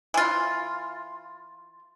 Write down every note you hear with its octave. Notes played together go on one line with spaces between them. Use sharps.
E3 F4